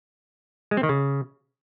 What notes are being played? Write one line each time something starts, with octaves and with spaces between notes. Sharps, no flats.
G#3
C4
D#3
C#3